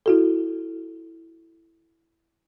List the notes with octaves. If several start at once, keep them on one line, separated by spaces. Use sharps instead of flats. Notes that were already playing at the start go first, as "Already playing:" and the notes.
E4 F#4 A4